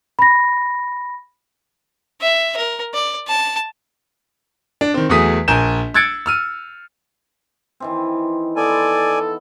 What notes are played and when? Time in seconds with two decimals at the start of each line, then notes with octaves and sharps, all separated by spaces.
0.19 B5 A#6
2.22 E5
2.57 A#4
2.94 D5
3.28 A5
4.81 D4
4.94 D#3 C4
5.09 E2 F#3 A3 G#4 D#6 B6
5.48 A#1 A#4 G#5 G6 E7
5.94 E6 F#6 G#6 A6 C#7 D7
6.26 E6 F6 D#7
7.80 D#3 E3 C4
8.57 B3 A4 D5 G#5